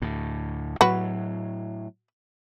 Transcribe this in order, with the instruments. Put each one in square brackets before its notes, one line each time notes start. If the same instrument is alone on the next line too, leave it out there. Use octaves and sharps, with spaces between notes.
[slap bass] D2 A2
[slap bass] A2 F#3 [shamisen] F#4 B4